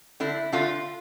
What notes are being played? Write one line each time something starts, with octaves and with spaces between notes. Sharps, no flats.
D3 A3 D4 E4
D3 A3 D4 F4